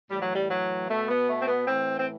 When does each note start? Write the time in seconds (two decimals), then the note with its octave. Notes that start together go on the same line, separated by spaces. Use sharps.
0.10 A2 E3 G3
0.21 F#3
0.33 G3
0.49 F#3
0.88 B2 A3
1.08 B3
1.27 A3
1.41 C4
1.48 B3
1.67 A2 E3 C4
1.97 C4